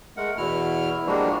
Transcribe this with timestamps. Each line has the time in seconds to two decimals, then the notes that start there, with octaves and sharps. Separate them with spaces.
0.17 G#3 A3 A#4 F#5
0.38 E2 B2 E4 F6
1.07 F3 G3 G#3 A#3 D4 F#4